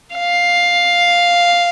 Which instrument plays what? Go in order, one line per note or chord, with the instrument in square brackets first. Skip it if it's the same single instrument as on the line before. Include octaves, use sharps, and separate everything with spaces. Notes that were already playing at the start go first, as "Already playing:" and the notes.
[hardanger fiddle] F5